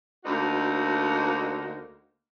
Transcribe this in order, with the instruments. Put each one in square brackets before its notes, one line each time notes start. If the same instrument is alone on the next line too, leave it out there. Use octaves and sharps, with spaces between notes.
[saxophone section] D2 D3 A#3 D#4 F#4 C5